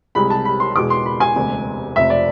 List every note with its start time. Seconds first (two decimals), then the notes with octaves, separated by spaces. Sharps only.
0.15 C2 C3 G#3 B5
0.30 A5
0.45 B5
0.60 C6
0.75 E2 B2 G#3 D6
0.90 C6
1.06 B5
1.20 G#5
1.36 E1 D2 C3
1.95 F1 F2 C3 E5
2.10 D5